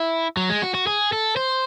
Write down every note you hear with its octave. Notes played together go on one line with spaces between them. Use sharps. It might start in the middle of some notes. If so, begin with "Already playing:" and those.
Already playing: E4
F#3
G#3
F#4
F#4
G#4
A4
C5